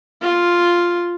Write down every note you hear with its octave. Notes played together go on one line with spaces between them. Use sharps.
F4